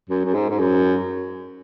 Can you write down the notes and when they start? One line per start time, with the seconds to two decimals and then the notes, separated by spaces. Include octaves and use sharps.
0.09 F#2
0.25 F#2
0.34 G#2
0.49 G#2
0.59 F#2